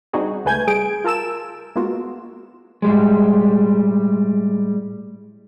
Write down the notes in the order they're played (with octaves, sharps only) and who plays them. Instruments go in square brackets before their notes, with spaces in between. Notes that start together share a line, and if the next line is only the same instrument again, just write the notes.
[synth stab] G3 C4 D4 D#4 F#4 G#4
C#2 A3 B4 G#5 G6 G#6
G3 G#4 G#5 D7
F4 A#4 A5 E6 E7
G#3 A#3 B3 F4 F#4
[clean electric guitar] A2 G3 G#3